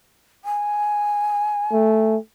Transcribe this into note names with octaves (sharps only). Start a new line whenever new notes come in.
G#5
A3